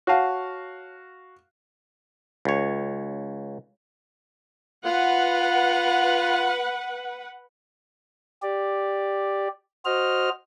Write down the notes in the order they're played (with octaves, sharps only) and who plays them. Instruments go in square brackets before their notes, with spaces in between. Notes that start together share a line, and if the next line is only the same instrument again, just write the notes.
[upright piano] F#4 F5 [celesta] C#5 F#5 A5
[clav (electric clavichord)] C#2 C#5
[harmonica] F4 [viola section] B4 F#5
[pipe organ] G4 D5
F#4 C5 D#5 F6